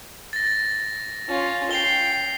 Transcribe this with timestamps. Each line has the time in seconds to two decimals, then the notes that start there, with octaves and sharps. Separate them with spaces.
0.33 A6 A#6
1.28 C#4 F4
1.71 G5 C7 F7 G7